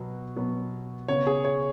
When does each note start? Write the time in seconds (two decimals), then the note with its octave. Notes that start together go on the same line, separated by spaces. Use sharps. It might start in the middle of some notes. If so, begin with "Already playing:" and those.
Already playing: B2 F#3 B3
0.36 B2 F#3 B3
1.08 C#3 B3 C#5
1.27 G#4
1.44 C#5